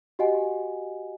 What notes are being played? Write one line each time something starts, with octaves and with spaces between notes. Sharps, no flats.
F#4 G4 D#5 F#5 G#5